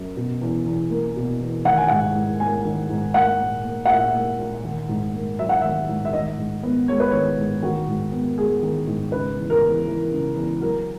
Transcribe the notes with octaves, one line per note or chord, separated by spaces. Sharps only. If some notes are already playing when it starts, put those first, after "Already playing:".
Already playing: F#2
B2
E2
E2
A#3
B2
E2
D#3 F#5
G#5
G#2 F#5
G#2
A#3 G#5
D#3
G#2
A#3 F#5
A#2
A#3
F#5
A#2 E5
A#3
A#2
D#3
G#2
A#3
F#3 E5
F#5
D#3 E5
G#2
E5
D#3 D#5
G#2
B3
G#3 C#5
B4
D#3 C#5
G#2
D#3 F#4
G#2
B3
G#3 G#4
D#3
G#2
C#3 B4
E2
A#4
E2
E3
C#3
E2
F#3 A#4